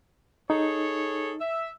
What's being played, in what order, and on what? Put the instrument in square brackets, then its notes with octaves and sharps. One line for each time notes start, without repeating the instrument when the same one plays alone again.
[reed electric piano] D#4 [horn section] G#4 A4 C#5
[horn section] E5